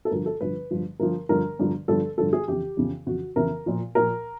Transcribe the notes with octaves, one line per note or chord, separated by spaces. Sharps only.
A4
G2 D3 F3 A#4
A4
G2 D3 F3 B4
G2 D3 F3
G2 D3 F3 A#4
G2 D3 F3 A#4
G2 D3 F3
G2 D3 F3 A4
G2 D3 F3 A4
G#4
F2 C#3 E3 G4
F2 C#3 E3
F2 C#3 E3 F#4
F2 C#3 E3 A#4
A#2 F3
A#2 F3 A#4